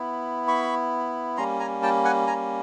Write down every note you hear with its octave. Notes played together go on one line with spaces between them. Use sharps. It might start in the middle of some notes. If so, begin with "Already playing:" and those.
Already playing: B3 E4
B5 C#6
G3 A#3 C#4 A#5 C6
G#5 A#5
G5 A5
F#5 G#5
G#5 A#5